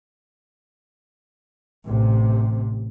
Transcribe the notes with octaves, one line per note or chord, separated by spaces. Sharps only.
A1 C3